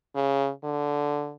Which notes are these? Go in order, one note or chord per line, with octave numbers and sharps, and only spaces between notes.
C#3
D3